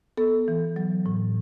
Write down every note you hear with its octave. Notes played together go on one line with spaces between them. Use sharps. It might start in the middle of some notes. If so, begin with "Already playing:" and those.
B3 A4
E3
F#3
A2